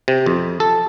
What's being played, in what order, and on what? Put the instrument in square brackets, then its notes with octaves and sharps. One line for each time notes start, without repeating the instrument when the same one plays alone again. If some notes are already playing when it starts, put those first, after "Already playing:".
[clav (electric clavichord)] C3
F2
A4